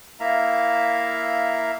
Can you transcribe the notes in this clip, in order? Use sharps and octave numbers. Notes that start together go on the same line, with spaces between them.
A#3 E4 E5 F5 A#5